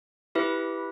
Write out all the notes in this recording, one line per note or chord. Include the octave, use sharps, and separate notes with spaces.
E4 G4 B4 E5